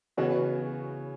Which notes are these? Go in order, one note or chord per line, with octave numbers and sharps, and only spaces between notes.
C#3 E3 B3 F#4 C#5